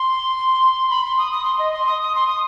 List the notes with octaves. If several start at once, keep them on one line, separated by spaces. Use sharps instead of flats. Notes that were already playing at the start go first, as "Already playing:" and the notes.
Already playing: C6
B5
C6
D#6
D#6
C6
D#5
C6
D#6
D#6
C6
D#6